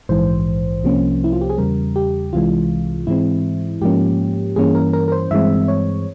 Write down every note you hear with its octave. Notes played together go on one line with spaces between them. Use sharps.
A#1 G#2 E3 C5
C2 C3 F3 A#3 C#4
E4
F4
G4
G#4
E2 C#3 G3 A#4
G4
C2 C3 E3 G#3 F4
G#2 E3 G#3 C4 E4
G#2 F3 A#3 C#4 G4
G2 E3 A#3 C#4 G#4
A#4
A#4
A#4
C5
G2 E3 G#3 C4 E5
C#5